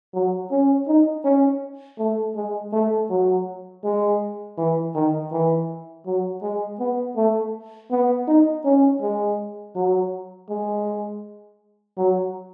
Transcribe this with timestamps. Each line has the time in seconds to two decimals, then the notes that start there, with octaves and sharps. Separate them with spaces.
0.14 F#3
0.51 C#4
0.88 D#4
1.24 C#4
1.99 A3
2.36 G#3
2.73 A3
3.10 F#3
3.84 G#3
4.58 E3
4.95 D#3
5.32 E3
6.06 F#3
6.43 G#3
6.79 B3
7.16 A3
7.91 B3
8.28 D#4
8.65 C#4
9.02 G#3
9.75 F#3
10.50 G#3
11.98 F#3